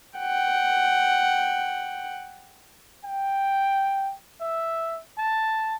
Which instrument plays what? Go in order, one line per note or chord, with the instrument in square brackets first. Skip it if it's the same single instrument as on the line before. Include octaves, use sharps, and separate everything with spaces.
[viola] F#5 G5
[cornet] G5
E5
A5